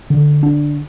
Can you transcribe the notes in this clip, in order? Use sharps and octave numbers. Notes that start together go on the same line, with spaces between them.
D3
D4